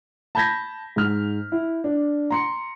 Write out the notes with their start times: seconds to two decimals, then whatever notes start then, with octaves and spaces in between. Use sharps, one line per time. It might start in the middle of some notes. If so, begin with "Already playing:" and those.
0.35 A5 B5 G6 G#6 A#6 B6
0.96 G#2 F6
1.52 E4
1.84 D4
2.30 A#5 C6 C#7